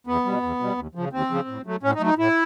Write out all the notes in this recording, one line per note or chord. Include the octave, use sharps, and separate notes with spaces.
E2 B3
B2 G3
E2
B2 G3
D#2
C#3 F3
D#2 C4
C#3 F3
A2
F#3 A3
A2 C#4
D#4
F#3 A3
D#4
A2 E4